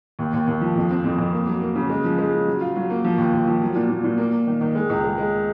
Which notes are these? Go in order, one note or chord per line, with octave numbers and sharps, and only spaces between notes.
D#2
D#2
D#2
F3
F2
C4
F2
F2
A#3
F#3
A#3
C#3
G#3
F3
G#3
C#3
F#3
F4
F#3
A#3
F3
D#2
D#2
F3
F#3
A#2
A#2
A#2
A#3
A#3
D#3
D#3
G#3
C#2
G#3
G#3